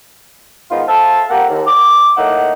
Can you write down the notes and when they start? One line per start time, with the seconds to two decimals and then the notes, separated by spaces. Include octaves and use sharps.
0.70 G#2 D#3 B3 D#4 F4
0.87 A4 C5 E5 F5 A5
1.30 F2 A#3 G4 A#4 F#5
1.50 D#2
1.67 D6
2.17 A2 A#3 D#4 E5 F#5